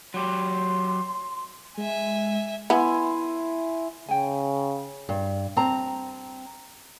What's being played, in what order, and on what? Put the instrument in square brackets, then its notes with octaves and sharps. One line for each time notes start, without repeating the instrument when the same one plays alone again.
[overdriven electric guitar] F#3 G4 [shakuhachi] C6
[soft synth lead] G#3 [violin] E5 G#5
[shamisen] B3 [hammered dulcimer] E4 G#5 C6
[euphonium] C#3 [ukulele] G5 G#5
[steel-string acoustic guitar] G2
C4 A5 A#5